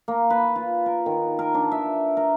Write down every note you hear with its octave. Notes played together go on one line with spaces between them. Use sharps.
A#3
B4
F4
A#4
D#3
A#4
D4
E5
A#4